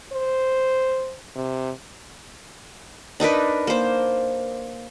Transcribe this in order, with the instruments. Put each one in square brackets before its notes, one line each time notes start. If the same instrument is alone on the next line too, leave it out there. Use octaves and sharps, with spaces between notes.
[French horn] C5
C3
[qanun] D4 D#4 A#4 B4
A#3 C5